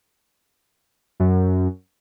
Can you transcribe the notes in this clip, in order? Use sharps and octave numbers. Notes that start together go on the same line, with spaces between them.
F#2